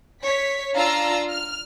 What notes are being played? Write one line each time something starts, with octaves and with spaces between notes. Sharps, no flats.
C#5 B6
D4 F4 F5 A#5 E6
F6